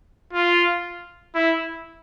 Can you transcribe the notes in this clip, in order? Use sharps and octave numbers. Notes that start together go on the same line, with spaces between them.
F4
E4